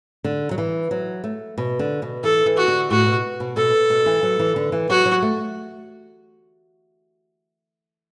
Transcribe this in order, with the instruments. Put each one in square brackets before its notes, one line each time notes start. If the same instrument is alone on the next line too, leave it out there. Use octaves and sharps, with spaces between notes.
[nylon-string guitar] D3
F#3
E3
F#3
A3
B2
D3
B2
[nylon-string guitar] E3 [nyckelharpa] A4
[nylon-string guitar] E3
[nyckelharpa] F#4
[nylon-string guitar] D3
[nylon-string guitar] A2 [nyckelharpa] F#4
[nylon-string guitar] B2
B2
[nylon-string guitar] B2 [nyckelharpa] A4
[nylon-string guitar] B2
E3
F#3
E3
D3
E3
[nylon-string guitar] F#3 [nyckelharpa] F#4
[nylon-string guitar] F#3
A3